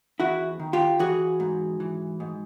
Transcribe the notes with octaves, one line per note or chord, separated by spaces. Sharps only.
E2 E4 F#4
D#3
F4 G4
E3 F#4 G#4
G#2
E3
G#2